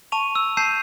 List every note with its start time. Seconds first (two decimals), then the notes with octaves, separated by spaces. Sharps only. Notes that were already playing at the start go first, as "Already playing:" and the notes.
0.12 A5 C#6 D#7 F7
0.35 E6
0.57 A5 E6 G6 C7 D#7